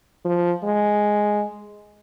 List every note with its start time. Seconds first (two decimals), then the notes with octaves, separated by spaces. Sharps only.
0.25 F3
0.64 G#3